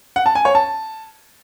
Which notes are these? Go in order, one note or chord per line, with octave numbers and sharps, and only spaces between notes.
F#5
A5
G#5
C#5
A5